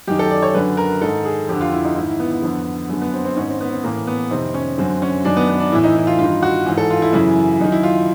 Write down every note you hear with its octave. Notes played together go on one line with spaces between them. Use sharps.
F#2 D#3 G4
A4
D5
C#5
F#2 D3 B4
A#4
G#2 D#3 A4
G#4
F2 D3 G4
F4
E4
D#4
G#2 D#3 E4
E4
B3
B3
F2 D3
F#2 D3 B3
B3
C4
C4
G#2 D#3 C#4
C4
B3
C4
A2 E3 A#3
B3
F2 C3 D#3 C4
C#4
F#2 D3 C4
C#4
F#2 D#3 D4
B3
B3
D4
A2 E3 E4
D#4
E4
F4
G2 D#3 F4
F#4
G#2 E3
A4
F4
E4
F#2 C#3 E3 E4
F#2 D#3 D#4
E4
F4